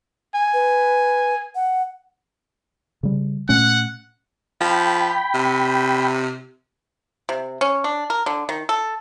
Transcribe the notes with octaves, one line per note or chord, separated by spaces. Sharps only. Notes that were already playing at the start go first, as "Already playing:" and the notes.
G#5
B4
F#5
C#3 G3
A#2 A3 C#4 F#5
F3 G5 B5
C3
C3
C#4
D4
A#4
D3
D#3
A4